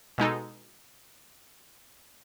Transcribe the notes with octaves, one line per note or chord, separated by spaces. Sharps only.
B2 G#3 D#4 A4